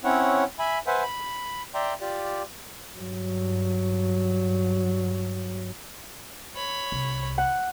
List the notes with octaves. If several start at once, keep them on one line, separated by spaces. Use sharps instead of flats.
C4 C#4 E4 C#5 F#5
E5 G#5 B5
B4 C5 E5 F#5 G#5
B5
D5 E5 G5 A#5 C6
F4 G4 D5
G2 F#3
C#5 B5
C2
F#5